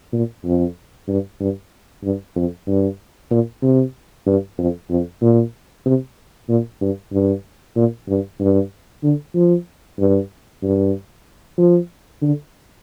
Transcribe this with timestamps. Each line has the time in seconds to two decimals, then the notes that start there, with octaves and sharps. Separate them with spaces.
0.13 A#2
0.45 F2
1.08 G2
1.40 G2
2.03 G2
2.36 F2
2.68 G2
3.31 A#2
3.62 C3
4.26 G2
4.58 F2
4.90 F2
5.22 A#2
5.86 C3
6.49 A#2
6.81 G2
7.13 G2
7.76 A#2
8.08 G2
8.40 G2
9.03 D3
9.35 F3
9.99 G2
10.63 G2
11.58 F3
12.22 D3